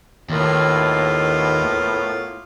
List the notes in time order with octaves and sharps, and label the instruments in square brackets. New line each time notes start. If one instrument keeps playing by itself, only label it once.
[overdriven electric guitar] D#2 [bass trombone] A2 [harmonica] A#3 B3 F4